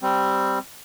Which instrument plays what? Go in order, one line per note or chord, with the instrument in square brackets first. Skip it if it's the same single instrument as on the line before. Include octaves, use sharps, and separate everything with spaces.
[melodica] G3 C4